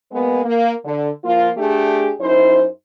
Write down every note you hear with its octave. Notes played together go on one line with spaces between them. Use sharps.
G#3 A#3 B3
A#3
D3
F3 A#3 F4
A3 D4 G4 G#4
F#2 D#4 E4 C5